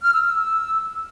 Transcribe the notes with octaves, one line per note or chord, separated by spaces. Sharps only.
F6
E6
E6